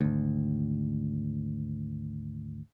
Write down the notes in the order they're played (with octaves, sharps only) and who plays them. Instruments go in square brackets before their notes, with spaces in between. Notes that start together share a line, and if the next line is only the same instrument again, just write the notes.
[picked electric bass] G#1 D2